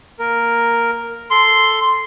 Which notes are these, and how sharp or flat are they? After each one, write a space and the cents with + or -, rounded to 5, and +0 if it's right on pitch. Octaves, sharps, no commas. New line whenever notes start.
A#3 +0 A#4 +0
A4 +0 C6 -5